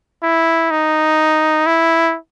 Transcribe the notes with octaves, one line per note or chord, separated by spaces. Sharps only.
E4
D#4
E4